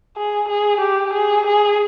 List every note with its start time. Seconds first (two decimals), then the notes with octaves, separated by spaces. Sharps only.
0.16 G#4
0.48 G#4
0.81 G4
1.13 G#4
1.46 G#4